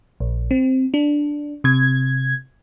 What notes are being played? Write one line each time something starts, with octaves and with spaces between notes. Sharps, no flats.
A#1
C4
D4
C3 G#6